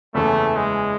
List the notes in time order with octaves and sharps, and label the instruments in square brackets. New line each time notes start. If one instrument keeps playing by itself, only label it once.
[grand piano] F#1 E2 C#3 E3 [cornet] A3
[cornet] G#3